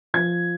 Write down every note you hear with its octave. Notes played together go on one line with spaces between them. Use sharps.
F3 G#6